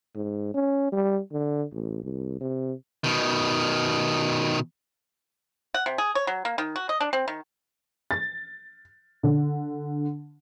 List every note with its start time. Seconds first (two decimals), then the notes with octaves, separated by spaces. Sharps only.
0.16 G#2
0.54 C#4
0.92 G3
1.33 D3
1.73 A1
2.04 C2
2.41 C3
3.04 B2 D#3
5.74 F#5
5.86 C3
5.98 G#4
6.15 C#5
6.27 F#3
6.45 A#3
6.58 D#3
6.76 F#4
6.89 D#5
7.00 D4
7.13 C4
7.28 D#3
8.11 A6
9.23 D3